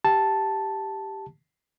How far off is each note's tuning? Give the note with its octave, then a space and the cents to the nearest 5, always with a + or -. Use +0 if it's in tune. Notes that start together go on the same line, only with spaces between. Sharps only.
G4 +0 A5 +0